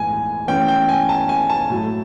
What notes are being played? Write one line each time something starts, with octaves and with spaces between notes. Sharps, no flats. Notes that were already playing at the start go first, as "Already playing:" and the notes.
Already playing: A2 E3 G#3 B3 G#5
E3 A3 C#4 G5
G5
G#5
A5
G#5
A5
A2 F#3 A3